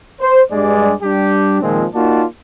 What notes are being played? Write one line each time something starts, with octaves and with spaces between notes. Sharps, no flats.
C5
G2 G#3 D5
G3 D4 G4
A#2 D#3 F3 G#3 C4
A#3 D#4 F4 F#4 D5 A5